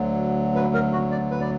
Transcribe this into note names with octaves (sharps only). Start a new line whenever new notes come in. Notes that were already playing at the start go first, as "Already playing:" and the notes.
Already playing: D2 D3 F#3
B4
A#4
F#4
D5
B4
D5